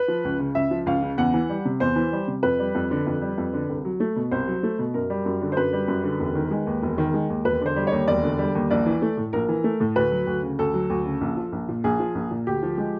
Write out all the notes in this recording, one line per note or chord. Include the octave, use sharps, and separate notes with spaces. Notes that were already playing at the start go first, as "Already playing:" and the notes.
Already playing: B4
F3
C#2
C#3
C#2 E5
F3
C#2 F5
C#3
E2 F#5
E3
G3
C3
E2 C5
E3
G3
C3
F2 B4
G3
F2
D3
F2
G3
F2
D3
C2
F#3
A3
B2
C2 C5
F#3
A3
B2
F#2 A#4
G3
F#2
D3
C5
F#2 B4
G3
F#2
D3
E1
D#3
G#3
D#2
E1
D#3
G#3
D#2
E1 B4
D3 C5
G3
C#5
D#2
E1 D5
D3
G3
D#2
A#1 D5
E3
A3
A2
A#1 A#4
E3
A3
A2
D2 B4
F#3
D2
C#3
D2 A4
F#3
D2
C#3
A#1
F3
A#1
A#2
A#1 G#4
F3
A#1
A#2
D2 G4
F3
G#3